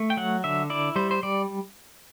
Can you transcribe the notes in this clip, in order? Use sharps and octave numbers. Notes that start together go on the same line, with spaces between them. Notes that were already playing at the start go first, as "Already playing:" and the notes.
Already playing: A3
G5
F#3 F#5
D3 E5
E4 D5
G3 C5
C5
G3 D5